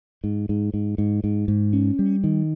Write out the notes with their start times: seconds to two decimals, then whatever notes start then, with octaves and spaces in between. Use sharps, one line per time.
0.24 G#2
0.49 G#2
0.74 G#2
0.98 G#2
1.24 G#2
1.48 G#2
1.73 C#4
1.99 G3
2.24 D#3